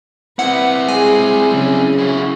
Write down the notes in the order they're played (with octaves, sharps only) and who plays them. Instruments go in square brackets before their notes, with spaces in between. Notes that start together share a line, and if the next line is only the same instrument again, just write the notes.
[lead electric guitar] C4 E4 [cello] B4 [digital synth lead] F#5
[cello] G#3 G#4 [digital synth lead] G#5
[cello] C#3 F#3
[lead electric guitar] E4 F#4